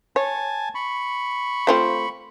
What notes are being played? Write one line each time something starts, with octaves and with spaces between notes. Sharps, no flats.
C#5 G#5 A5
B5 C#6
A3 C4 F4